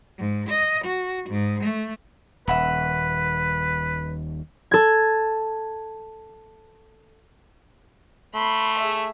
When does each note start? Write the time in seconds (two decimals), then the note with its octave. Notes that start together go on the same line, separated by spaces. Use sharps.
0.18 G#2
0.49 D#5
0.84 F#4
1.29 G#2
1.63 A3
2.48 D#1 B4 E5 F#5 B5
4.71 A4 G#6
8.35 A3 B5 C6
8.78 G#4 E5